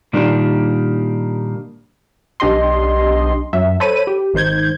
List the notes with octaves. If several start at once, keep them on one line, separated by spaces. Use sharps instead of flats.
A#2 D#3 G3 A#3 D4
B1 D4 G4 D#5 C6
F#2 F#3 E5
A4 C5 C#5 B5 D#7
G4
G#1 D#3 C5 G6 G#6